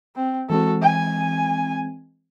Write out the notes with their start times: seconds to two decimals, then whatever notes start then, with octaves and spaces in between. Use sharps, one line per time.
0.16 C4
0.50 E3 G#3 C4 F#4 A4
0.82 G#5